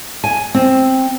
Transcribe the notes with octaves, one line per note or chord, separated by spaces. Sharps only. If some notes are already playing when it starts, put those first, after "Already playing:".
G#5
C4